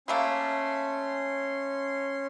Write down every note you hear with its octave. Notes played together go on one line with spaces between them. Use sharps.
G3 A3 A#3 C#4 C6